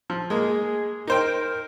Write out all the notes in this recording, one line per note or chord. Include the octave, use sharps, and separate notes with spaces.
F3
G#3 A#3 G#4
D#4 A#4 C5 G5